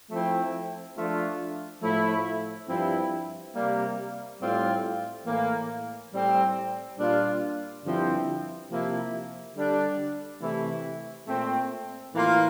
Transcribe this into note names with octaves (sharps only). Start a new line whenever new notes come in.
F3 A3 C4 E4
F3 A3 D4 F4
A2 F3 A3 E4
G2 F3 C4 E4
C3 G3 A#3
A2 G3 C4 F4
A2 E3 A#3
A2 G3 C4
A#2 G3 D4 F4
G2 D3 F3 C4 E4
C3 F3 A#3 E4
D3 G3 D4
C3 E3 A3 E4
A#2 A3 C4
A2 E3 A#3 F4